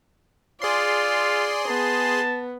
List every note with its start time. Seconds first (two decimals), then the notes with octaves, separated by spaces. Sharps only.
0.62 F4 G#4 D5 C6
1.68 B3 A5